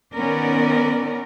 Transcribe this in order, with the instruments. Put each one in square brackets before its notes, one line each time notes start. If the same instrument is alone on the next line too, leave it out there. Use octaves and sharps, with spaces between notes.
[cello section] D#3 B3 C#4 A#4 D5